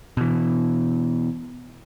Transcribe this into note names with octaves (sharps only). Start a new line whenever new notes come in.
B2 E3